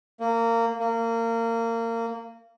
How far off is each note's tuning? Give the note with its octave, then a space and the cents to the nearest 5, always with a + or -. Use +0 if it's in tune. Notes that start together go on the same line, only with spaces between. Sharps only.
A#3 -20
A#3 -25